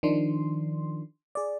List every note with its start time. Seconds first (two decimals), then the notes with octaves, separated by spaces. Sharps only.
0.03 D#3 F3 D4 C6
1.35 G#4 D5